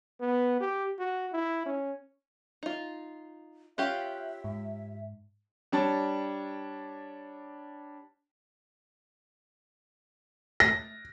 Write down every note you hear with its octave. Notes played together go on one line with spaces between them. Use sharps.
B3
G4
F#4
E4
C#4
D#4 F4
C#4 F4 G4 E5 F5 G5 F#6
G#2
G3 D4 C#5 A5
A#6